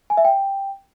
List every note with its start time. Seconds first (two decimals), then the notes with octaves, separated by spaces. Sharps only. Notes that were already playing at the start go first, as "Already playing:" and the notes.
0.10 G#5
0.17 E5
0.25 G5